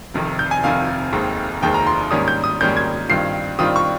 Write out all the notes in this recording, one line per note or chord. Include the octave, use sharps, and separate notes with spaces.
F1 F2 C3 D#3
G6
G#5
F1 F2 C3 D#3 F5
F1 D#2 D#3 G#3 C4
F1 D#2 D#3 G#3 C4 G5
A#5
C6
G#2 D#3 G3 A#3 C#4 D#6
G6
D#6
G#2 D#3 G3 A#3 C#4 G6
G#6
G2 D#3 G3 C4 F4 C7
G2 D#3 G3 C4 F4 D#6
C#6